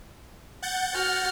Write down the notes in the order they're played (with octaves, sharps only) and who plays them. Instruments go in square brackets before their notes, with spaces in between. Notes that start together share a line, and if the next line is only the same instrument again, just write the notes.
[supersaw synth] F#5 G6 A6
[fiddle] F#4 F6